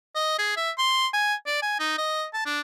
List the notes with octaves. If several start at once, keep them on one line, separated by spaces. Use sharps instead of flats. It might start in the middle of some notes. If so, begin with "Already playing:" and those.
D#5
G#4
E5
C6
G#5
D5
G#5
D#4
D#5
A5
D4